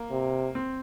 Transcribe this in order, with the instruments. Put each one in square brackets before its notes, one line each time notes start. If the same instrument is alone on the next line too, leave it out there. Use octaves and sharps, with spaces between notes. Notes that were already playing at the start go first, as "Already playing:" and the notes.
Already playing: [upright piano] A#3
[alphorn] C3
[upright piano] C4